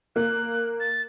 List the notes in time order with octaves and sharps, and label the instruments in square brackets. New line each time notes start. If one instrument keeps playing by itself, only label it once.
[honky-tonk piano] A#3 [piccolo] F#6
[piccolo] A6